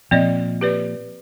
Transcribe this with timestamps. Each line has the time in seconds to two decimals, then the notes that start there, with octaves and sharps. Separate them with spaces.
0.11 A#2 F3 C4 D5 D#5
0.61 G4 B4 D5